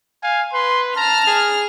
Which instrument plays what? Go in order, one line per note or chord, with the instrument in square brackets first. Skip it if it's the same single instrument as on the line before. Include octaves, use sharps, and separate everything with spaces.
[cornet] F5 [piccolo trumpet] G#5
[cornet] B4 [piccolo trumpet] C6
[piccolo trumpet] A5 [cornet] A#5 [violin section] F6
[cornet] G#4